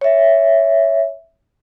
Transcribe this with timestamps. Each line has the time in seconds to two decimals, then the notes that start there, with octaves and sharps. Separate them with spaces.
0.01 C#5 E5